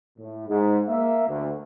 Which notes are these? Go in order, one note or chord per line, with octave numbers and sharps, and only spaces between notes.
A2
G#2
A#3 E5
D2